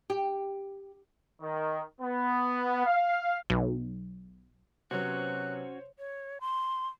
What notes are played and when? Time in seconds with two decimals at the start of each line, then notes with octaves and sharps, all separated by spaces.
0.10 G4
1.42 D#3
2.01 B3
2.86 F5
3.50 B1
4.91 C3 F#3 B3 C#4 F#4 C5 C#5 F#6
5.97 C#5
6.41 C6